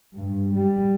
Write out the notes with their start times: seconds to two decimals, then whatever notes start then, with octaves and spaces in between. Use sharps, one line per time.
0.17 G2
0.58 G3